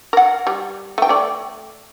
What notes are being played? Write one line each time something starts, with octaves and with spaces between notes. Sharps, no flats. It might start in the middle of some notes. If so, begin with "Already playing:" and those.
A#4 F#5
G3
A3 G5
A3 D5